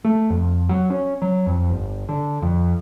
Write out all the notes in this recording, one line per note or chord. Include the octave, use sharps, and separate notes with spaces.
A3
F2
F#3
C#4
F#3
F2
G1
D3
F2